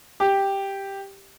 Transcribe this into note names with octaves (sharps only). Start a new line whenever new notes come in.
G4